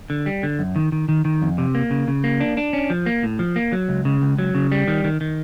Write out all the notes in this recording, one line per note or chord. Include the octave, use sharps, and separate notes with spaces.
D3
G3
D3
F#2
D#3
D#3
D#3
D#3
F2
C3
A#3
C#3
C#3
A#3
D4
D4
C#4
F3
A#3
A2
F3
A#3
F#3
C#2
C#3
C#2
F#3
C#3
G3
D#3
D#3
D#3